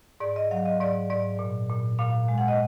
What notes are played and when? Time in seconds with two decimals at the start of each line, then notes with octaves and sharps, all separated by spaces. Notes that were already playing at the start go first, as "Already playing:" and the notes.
0.20 G#2 D5
0.36 D#5
0.51 F#3 F5
0.66 D#5
0.80 G#2 D5
1.10 G#2 D5
1.39 A#2
1.69 A#2
1.99 A#2 F5
2.28 G#3
2.38 F#5
2.48 D#5